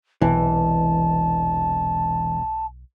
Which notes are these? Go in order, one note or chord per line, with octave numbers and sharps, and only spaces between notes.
E1 B1 C3 E3 A5